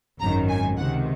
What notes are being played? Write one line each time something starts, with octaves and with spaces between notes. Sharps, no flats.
G#1 F#2 D#3 A#5
G#5
C#2 C3 D#3 F#5